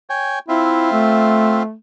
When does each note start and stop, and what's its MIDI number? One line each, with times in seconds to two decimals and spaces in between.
0.10 0.39 73
0.10 0.39 79
0.10 0.39 80
0.48 1.63 60
0.48 0.90 64
0.48 1.63 65
0.48 1.63 76
0.92 1.74 57